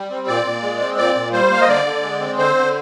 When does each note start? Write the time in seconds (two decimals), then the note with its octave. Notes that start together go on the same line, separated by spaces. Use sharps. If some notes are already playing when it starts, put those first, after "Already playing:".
Already playing: G3
0.10 C4
0.27 A#2 D5
0.45 A#2
0.63 G#3
0.80 C4
0.97 A#2 D5
1.15 A#2
1.33 G3 C5
1.50 A#3 F5
1.61 D#5
1.68 D3 D5
1.85 D3
2.03 G#3
2.20 C4
2.38 D3 C5
2.56 D3